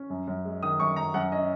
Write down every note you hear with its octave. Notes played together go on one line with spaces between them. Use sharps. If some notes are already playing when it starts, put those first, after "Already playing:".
Already playing: C#4
F#2
F#2
G#3
D#3 D#6
F#2 C#6
F#2 A#5
F#2 F#5
C#4 D#5